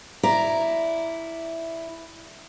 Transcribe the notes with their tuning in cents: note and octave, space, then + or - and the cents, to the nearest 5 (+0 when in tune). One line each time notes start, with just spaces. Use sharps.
E4 +0 D5 +0 A#5 +0